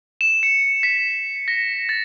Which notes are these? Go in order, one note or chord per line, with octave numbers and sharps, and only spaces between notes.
E7
C#7
B6
A#6
A6